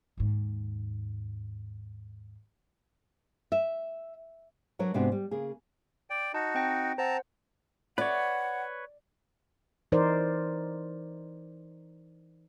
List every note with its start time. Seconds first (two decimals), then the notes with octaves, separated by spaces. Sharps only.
0.18 D#2 G#2
3.52 E5
4.79 F#3 D4 A#4 B4 C#5
4.94 G#2 C3 B3 D4 F#4
5.12 G3
5.31 C#3 A#3 G#4
6.10 D5 G5
6.34 D#4 F#4 D#5 A5
6.55 C4 G5 A#6
6.98 C4 C5 F#5 A5 A#5
7.98 B4 C#5 D5 F#5
9.92 E3 D#4 A#4 C5 D5